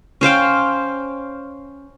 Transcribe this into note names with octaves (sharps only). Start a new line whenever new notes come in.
C#4 C5 F5 G5